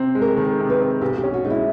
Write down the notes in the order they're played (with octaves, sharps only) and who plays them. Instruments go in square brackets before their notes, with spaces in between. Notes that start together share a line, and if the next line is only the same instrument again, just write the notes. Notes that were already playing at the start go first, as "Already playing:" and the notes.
Already playing: [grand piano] C3 C4
G#3
[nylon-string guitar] A#4
[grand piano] D#3 [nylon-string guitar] A4
[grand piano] C3
[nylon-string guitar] B4
[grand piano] C4
[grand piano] B1 [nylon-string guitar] G4
[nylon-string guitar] G4
[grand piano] C#4
[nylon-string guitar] F#4
[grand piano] G#3 [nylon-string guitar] D#4
[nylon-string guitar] E4